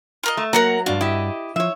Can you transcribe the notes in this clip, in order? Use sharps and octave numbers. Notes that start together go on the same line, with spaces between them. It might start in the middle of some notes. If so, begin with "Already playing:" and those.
F4 A#4 D#5
A3
F#3 A#3 A#4 F#5 A#5
G2 D4 F4 F#4
E4 G4 D#5
F3 C#5 E5